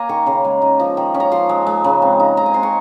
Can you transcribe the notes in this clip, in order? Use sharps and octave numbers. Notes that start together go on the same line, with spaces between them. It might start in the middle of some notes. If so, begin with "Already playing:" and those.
Already playing: A#3 G#5 A#5
D#3 C#6
C#3 C6
G#3
D#4
F3
D#3
C#4
A#5
F3 C6
G#3
G#3
C#3
C4
D#4
G#3 A#5
G#5
C4 C6
C#6